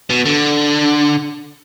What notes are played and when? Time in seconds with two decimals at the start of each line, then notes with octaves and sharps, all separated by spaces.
0.10 B2
0.26 D3